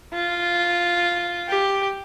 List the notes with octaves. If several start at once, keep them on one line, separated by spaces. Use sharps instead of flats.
F4
G4